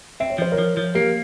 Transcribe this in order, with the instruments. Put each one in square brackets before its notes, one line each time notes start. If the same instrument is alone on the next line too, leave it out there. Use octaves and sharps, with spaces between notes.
[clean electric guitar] C4 [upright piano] E5
[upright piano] C#5
[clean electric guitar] F3 [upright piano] C5
[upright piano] A#4 C#5
[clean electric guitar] F3
F3
[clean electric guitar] A#3 [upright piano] G4 A#4